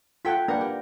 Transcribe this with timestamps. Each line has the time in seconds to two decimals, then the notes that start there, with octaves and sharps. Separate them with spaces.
0.25 F4 A4 F#5 G5 G#6 B6
0.48 A#3 D4 A#4 B4 F#5
0.61 G4